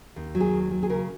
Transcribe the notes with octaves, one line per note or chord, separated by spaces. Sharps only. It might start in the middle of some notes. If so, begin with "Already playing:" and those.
D#2
F#3
G#4
D#2
F#3
G#4
C#3 A#4